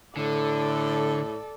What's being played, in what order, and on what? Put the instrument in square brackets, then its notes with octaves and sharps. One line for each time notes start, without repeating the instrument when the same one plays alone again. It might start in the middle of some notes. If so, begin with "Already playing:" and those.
[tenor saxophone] A2 [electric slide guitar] D3 [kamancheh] A4 D5